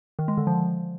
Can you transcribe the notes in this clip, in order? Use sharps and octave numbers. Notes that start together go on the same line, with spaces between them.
D#3
G#3
D3
F3